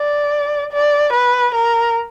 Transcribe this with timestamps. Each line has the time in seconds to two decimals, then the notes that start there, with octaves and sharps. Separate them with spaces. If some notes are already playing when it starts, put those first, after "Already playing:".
Already playing: D5
0.72 D5
1.13 B4
1.55 A#4